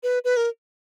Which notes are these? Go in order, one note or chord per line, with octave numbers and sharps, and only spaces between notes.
B4
B4
A#4